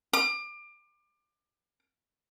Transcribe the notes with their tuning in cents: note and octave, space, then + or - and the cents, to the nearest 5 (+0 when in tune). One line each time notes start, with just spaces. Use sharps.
D6 +30